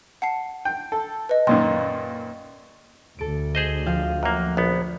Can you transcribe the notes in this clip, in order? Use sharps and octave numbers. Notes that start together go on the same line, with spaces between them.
F#5 A5 C7
G5
A4
B4 D#5
F#2 A#2 D#3 C6
D2 A4 D7
G#4 C5 D#5
F3 F5 G5
F#2 A#3 F#6
A#1 B3